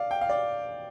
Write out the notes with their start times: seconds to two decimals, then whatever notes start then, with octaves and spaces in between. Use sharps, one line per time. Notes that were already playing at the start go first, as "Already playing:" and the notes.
Already playing: D5 F5
0.11 G5
0.21 F5
0.29 D5